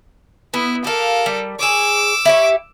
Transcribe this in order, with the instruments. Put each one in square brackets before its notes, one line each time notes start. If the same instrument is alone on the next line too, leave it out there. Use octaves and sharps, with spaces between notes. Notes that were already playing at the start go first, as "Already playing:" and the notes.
[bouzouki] B3 [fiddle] E4
[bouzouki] G4 F5 [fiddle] A4 A#4
[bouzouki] G3
[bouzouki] G#4 C#5 [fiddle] D6 E6
[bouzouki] E4 G4 C#5